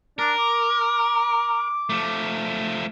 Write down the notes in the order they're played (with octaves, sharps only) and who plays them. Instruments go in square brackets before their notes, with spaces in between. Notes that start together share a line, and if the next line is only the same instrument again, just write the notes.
[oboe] D4 [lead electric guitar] A#4
[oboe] D6
[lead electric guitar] F3 A3